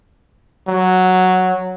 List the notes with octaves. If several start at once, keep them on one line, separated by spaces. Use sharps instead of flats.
F#3